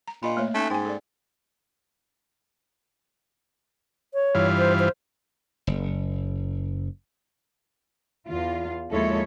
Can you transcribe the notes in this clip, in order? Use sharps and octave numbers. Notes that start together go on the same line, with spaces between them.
A#5
A#2 D#5 B5
A3 A#3 C#5
A3 C#4 D#4
G#2 G5 G#5
A4 D5
C#5
G2 E3 F4
C5
C5
F#1
E2 F4
D#2 F3 G#3 E4 A4 C#5